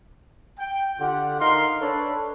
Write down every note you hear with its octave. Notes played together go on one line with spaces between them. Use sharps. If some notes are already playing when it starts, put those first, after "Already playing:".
G5
D3 F4 G4 F#5
D#4 A#4 F5 C6
D4 A4 B4 C#5